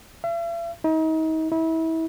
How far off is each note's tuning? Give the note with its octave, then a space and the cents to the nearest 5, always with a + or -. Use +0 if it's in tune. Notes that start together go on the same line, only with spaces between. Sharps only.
E5 +45
D#4 +35
E4 -30